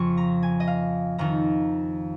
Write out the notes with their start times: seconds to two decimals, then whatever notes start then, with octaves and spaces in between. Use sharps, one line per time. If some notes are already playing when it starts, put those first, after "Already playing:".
Already playing: F2 C#3 F3 C#6
0.17 A#5
0.43 G#5
0.60 D#5
0.67 F5
1.18 F2 D#3 A#5